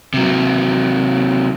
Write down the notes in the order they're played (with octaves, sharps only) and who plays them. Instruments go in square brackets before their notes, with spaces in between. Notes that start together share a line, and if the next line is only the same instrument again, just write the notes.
[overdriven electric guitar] C3 F#3